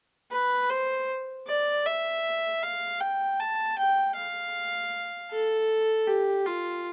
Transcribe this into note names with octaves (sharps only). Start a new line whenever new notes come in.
B4
C5
D5
E5
F5
G5
A5
G5
F5
A4
G4
F4